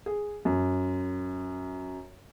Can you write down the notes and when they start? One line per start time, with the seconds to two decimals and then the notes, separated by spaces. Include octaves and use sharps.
0.06 G#4
0.45 F#2